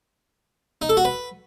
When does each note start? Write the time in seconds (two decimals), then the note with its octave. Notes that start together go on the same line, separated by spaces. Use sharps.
0.82 D#4
0.89 A4
0.97 F#4
1.05 B4